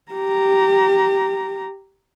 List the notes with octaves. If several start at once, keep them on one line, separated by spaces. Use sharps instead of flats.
G4 A#5